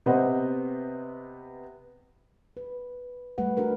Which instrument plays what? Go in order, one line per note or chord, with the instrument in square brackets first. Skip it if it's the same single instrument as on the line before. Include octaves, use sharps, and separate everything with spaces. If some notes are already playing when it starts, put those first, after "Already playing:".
[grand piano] C3 B3 C5 D#5 F#5
[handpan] B4
G3 A3 B4 F#5
D4 F#4 A#4 B4